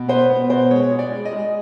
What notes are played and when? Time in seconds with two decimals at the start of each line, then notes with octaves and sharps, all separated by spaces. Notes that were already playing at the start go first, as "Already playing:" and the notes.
Already playing: B2
0.08 B3 C5
0.30 B3
0.50 B2 C5
0.71 G#3 C#5
0.92 G#3
0.99 D5
1.12 G#3
1.25 D#5
1.33 G#3